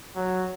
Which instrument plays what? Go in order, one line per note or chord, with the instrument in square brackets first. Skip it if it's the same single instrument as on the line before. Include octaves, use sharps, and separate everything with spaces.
[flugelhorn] F#3